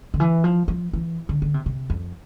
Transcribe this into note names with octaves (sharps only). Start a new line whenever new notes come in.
D3
E3
F3
F3
E3
D3
D3
C3
C3
F2